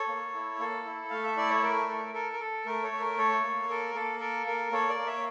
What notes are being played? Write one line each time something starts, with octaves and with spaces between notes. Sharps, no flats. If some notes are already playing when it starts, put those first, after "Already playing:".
Already playing: A4 C#5
A#3
E4
A#3 A4
E4
A3 F5
E5
E4 D5
C#5
A3 A#4
A4
A4 A#4
A#4
A4
A3 A#4
A4 C#5
A3
A#4
A4 C#5
A#3
A4 A#4
A#3 A4
A4 A#4
A#3 A#4
A#3 A4 C#5
A#4 D5
A#3
C#5 E5